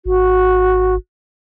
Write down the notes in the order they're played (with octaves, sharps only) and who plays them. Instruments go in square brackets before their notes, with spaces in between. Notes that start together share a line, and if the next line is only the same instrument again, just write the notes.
[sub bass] G#1 [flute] F#4